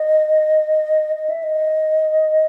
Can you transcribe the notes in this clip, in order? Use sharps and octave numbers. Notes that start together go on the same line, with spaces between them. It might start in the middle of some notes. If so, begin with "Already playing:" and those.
Already playing: D#5
D#5
E5
D#5